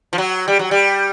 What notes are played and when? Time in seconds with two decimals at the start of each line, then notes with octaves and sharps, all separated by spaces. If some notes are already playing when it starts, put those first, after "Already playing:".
0.13 F3
0.18 F#3
0.48 G3
0.59 F#3
0.71 G3